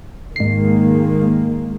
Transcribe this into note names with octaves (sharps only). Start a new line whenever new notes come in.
G#2 D#3 G#3 A#3 C7